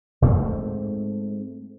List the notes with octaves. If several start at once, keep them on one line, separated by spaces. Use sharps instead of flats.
G#2 A3 C4